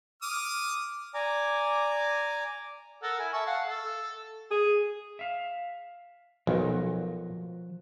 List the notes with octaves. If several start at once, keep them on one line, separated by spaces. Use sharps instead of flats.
D6 D#6 F6
D5 G#5 A#5 D6
A4 A#4 F#5
E4 G#5
E5 A5 C#6
F5 F#5 A5
A4
G#4
E5 F5
B1 F3 F#4 A#4